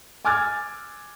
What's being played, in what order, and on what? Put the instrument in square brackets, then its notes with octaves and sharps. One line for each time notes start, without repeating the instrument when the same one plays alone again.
[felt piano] G#5 D6 E6 F6 G#6 A6